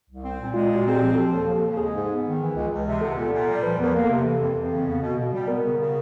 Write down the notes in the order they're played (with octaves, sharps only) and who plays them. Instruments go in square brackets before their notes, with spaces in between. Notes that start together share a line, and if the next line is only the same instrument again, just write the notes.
[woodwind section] C2
C4
A#2
[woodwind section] G#3 [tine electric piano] F4
[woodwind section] A#2
[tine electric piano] F#4
[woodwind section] C4 [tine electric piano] G#4
[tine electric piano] G4
[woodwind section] F3
[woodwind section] F3 [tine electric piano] A4
[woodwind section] D#2
D#2
C#3
[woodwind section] G#3 [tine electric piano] G#4
[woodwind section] G#2
B3
D#3
E3
C#2
C#2
C3
[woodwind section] B3 [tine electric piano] A4
[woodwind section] A#2
A#2
G3
[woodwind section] F3 [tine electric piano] B4
[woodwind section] E2
[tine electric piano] A#4
[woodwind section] A#3
[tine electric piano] A4
[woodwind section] C3
E3
F2
F2
C#3
B3
B2
B2
G3
[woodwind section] B3 [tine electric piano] A#4
[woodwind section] C#3
C#3